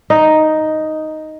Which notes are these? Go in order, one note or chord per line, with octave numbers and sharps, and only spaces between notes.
D#4